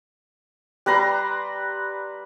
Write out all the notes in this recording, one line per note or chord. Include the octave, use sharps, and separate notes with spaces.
G3 B4 A#5 C6